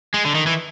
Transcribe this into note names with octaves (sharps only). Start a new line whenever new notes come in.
G#3
D3
D#3
E3